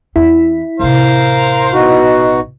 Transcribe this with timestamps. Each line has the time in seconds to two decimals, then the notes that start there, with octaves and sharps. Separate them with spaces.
0.16 E2 C4 E4
0.79 A1 C3 A#4 C5 F5
1.73 B2 D#4 F#4